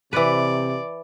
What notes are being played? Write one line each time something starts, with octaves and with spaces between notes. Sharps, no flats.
C3 E3 B4 D5